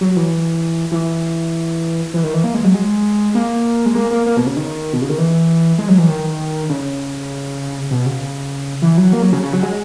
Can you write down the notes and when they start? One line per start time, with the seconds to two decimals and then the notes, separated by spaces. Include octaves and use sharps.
0.01 F#3
0.16 E3
0.92 E3
2.14 E3
2.24 D#3
2.34 E3
2.44 A#3
2.54 G#3
2.64 F#3
2.74 G#3
3.35 A#3
3.86 G#3
3.95 A#3
4.11 A#3
4.26 A#3
4.37 B2
4.46 C#3
4.56 D#3
4.93 B2
5.02 C#3
5.09 D#3
5.18 E3
5.78 G#3
5.88 F#3
5.98 E3
6.08 D#3
6.69 C#3
7.91 B2
8.06 C#3
8.82 E3
8.97 F#3
9.13 A#3
9.23 F#3
9.33 C#3
9.43 C#3
9.53 F#3
9.63 G#3